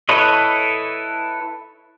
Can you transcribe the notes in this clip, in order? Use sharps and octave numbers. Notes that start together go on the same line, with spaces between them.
E4 A4 B4 C#5 D#5